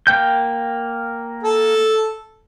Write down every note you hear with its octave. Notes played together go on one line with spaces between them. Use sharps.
A#3 G5 G6
A4